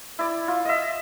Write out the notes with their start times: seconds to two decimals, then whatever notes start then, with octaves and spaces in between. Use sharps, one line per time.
0.19 E4 D5
0.48 F4
0.65 D#5 E5